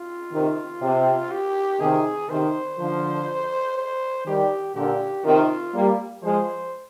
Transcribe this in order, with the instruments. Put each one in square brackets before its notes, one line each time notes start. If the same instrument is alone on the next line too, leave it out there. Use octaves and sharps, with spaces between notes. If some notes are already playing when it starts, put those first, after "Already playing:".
Already playing: [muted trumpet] F4
[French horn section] C3 D#3
C3
[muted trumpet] G4
[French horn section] C3 D#3 [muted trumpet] G#4
[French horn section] C3 D#3 [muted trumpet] C5
[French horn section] D3 F3
[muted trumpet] C5
[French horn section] D#3 G3 [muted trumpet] G4
[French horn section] A#2 D3 [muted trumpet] G4
[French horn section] C3 D#3 [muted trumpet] F4
[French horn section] G3 A#3
[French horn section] F3 G#3 [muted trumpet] C5